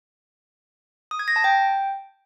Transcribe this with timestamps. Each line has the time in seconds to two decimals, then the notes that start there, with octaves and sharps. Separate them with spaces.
1.11 D#6
1.19 G#6
1.28 A#6
1.36 A5
1.44 G5